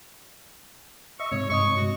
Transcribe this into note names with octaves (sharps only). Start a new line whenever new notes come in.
D#5 E5 C#6
G#2 C3 C#5
G2 D#5 C#6 D#6
F#4